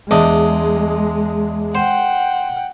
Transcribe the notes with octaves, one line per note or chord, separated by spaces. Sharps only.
E2 G#3 D4 D#5
C5 F#5 G5